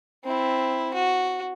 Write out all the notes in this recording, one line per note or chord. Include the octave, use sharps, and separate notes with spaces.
C4 E4
F#4